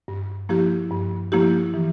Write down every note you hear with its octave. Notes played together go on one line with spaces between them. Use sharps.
G2
F3 A#3 E4 G4
G2
F3 A#3 E4 G4
E3